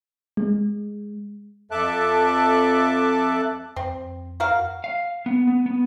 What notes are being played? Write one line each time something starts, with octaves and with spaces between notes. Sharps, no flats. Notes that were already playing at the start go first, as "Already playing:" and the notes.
G#3
F2 A4 E5 A5 D6 F#6
F2 C4
F#4 A#4 F5
F5
B3
B3
B3